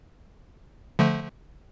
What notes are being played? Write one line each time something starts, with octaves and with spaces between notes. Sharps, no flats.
D3 F3 A3